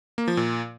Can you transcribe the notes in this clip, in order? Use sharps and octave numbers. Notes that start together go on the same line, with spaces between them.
A#3
F3
A#2